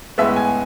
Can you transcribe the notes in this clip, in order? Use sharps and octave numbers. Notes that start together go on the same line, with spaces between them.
A2 G#3 B3 E5
G#5